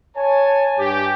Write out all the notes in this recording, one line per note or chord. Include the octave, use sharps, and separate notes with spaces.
C#5 G#5 A5
G2 G4